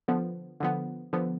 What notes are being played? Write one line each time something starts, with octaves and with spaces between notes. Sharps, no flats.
D3 F3 B3
D3 F3 B3
D3 F3 B3